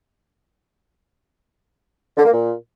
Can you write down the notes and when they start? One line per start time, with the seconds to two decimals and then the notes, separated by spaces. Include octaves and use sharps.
2.17 D3
2.25 A#3
2.33 A#2